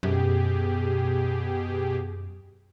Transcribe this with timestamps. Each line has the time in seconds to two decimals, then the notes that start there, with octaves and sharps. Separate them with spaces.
0.03 F#2 B2 G4 G#4